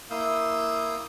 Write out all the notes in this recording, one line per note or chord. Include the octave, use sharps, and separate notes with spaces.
A#3 E4 F5 D#6 E6 G6